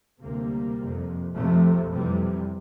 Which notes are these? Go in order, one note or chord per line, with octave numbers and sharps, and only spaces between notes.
D2 C3 G3 A#3
F2 C3
F2 C3 F3 A3
F2 C3 E3 G3